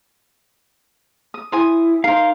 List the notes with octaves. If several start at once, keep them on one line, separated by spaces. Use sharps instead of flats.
D#6
E4 C5 G#5 D#6
D#4 A#4 C5 F5